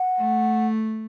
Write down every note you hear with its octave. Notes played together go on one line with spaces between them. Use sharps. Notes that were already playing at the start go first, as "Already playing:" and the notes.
Already playing: F#5
A3